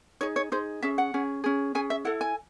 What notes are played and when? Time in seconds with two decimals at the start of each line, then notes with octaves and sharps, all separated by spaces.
0.21 D#4 G#4 C#5
0.36 C#5
0.52 D#4 G#4 C5
0.82 C#4 G#4 E5
0.98 F#5
1.14 C#4 G#4
1.44 C#4 G#4
1.75 C#4 G#4 G#5
1.90 E5
2.05 E4 A4 F#5
2.21 G#5